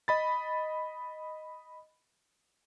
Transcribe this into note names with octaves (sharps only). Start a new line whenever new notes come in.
D#5 B5 A6